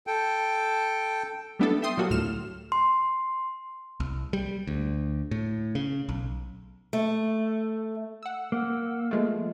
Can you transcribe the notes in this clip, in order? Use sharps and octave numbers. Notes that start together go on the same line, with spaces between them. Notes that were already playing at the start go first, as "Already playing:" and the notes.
A4 G5
G3 A3 B3 D4 E4 A4
E5 G5 C6 D#6
A#2 F#3 G3 A#3 F#4 A4
D2 A2 F6 E7
C6
C2
G3
D2
A2
C#3
B1
A3
F#5 E6
A#3
F3 G#3 A3